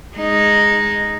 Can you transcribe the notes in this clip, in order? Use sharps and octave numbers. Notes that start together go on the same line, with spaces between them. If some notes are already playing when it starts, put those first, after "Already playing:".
G#3 D#4